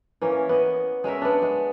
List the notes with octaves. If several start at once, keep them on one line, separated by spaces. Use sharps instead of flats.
E3 A#3 C#4
B3 D#5
G#3 C#4 A#4 E5
B3 D4
G#3